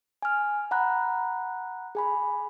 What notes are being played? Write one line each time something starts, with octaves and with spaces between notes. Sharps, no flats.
G#5 F6
F#5 A#5 B5 F#6
G#4 G#5 B5